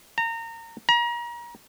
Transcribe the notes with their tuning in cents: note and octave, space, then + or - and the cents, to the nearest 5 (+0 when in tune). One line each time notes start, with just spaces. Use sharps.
A#5 -25
A#5 +35